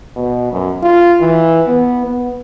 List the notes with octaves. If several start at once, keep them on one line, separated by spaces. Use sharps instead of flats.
B2
F#2
F4
E3
B3
B3